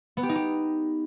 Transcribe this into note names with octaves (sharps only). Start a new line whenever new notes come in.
B3
G4
D#4
G4